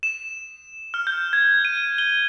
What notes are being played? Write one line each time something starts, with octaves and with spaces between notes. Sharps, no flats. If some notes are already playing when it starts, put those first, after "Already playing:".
E7
F6
G6
G#6
D#7
G7